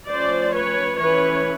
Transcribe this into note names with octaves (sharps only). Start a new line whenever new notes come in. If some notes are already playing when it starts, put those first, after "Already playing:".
F3 A3 C#4 C5 D5
B4 C#5
E3 A3 C#4 B4 C#5